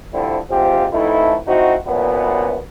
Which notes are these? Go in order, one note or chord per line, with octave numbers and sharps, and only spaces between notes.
D3 F3 G3 A3 C4 E4
D2 G#2 F3 C4 F4 G4
A1 F2 A3 D#4 E4
F2 C4 D#4 E4 F#4
C2 F#2 A#2 F#3 B3